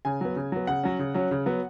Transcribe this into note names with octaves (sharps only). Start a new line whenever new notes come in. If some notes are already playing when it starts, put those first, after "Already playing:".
C#3 G#5
F#3 B3
C#3
F#3 B3
C#3 F#5
F#3 C#4
C#3
F#3 C#4
C#3
F#3 B3